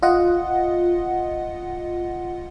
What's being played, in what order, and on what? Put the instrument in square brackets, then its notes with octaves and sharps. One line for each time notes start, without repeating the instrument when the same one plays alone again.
[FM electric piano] F4 D#5 F#5